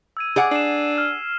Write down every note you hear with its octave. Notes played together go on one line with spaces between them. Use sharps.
E6 G#6 D#7
G#4 D5 F#5
D4 C7 E7
F6